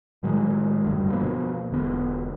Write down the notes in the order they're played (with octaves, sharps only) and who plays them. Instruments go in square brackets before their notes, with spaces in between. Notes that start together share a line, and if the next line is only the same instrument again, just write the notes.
[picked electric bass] A2 D#3 F#3 G#3
F#1 D2 G2
B2 F3 A#3 B3
E1 D3 B3